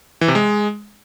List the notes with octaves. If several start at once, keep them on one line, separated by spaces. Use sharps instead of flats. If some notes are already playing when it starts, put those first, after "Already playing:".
E3
C3
G#3